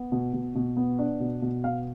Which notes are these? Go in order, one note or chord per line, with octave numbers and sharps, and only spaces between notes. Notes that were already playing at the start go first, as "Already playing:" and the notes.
Already playing: B3
B2
B2
B2
B3
D4
B2
B2
B3 F5